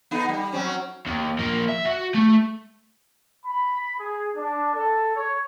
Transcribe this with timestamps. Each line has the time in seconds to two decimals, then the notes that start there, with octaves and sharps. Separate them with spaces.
0.11 B3 D#4 A4
0.29 G3
0.52 F#3 C4 C#4
1.06 D#2
1.39 F3 A#3
1.69 E5
1.85 F#4
2.15 A3
3.44 B5
3.98 G#4
4.34 D4
4.74 A4
5.15 C#5